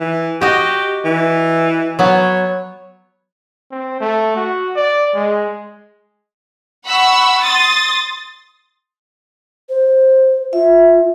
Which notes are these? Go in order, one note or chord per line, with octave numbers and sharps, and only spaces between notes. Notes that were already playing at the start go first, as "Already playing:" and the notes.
E3
F#4 G4 D#5
E3
F#3 B3 C#5
C4
A3
F#4
D5
G#3
F#5 B5 C#6 E6
C6 D#6 A6
C5
F4 E5